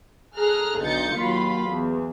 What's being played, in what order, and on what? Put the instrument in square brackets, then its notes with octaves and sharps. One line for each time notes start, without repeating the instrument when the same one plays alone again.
[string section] G#4 A4 A#5 F6 F#6
B1 D3 D#4 G6 A6 C#7
D#2 F#3 F4 B5
E2